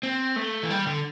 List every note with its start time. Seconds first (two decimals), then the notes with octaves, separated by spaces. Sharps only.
0.03 C4
0.36 A3
0.63 E3
0.70 G3
0.87 D3